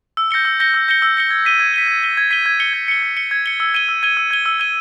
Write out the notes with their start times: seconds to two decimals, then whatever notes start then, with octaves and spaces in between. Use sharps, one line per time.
0.17 E6
0.31 G6 A#6 C#7 G7
0.45 E6
0.60 G6 A#6 C#7 G7
0.74 E6
0.88 G6 A#6 C#7 G7
1.02 E6
1.16 G6 A#6 C#7 G7
1.30 G#6
1.45 B6 D#7 G7
1.60 G#6
1.74 B6 D#7 G7
1.88 G#6
2.03 B6 D#7 G7
2.17 G#6
2.31 B6 D#7 G7
2.46 G#6
2.60 C#7 G7
2.73 G#6
2.88 C#7 G7
3.03 G#6
3.17 C#7 G7
3.31 G#6
3.46 C#7 G7
3.60 E6
3.74 G#6 D#7 G7
3.89 E6
4.03 G#6 D#7 G7
4.17 E6
4.31 G#6 D#7 G7
4.46 E6
4.60 G#6 D#7 G7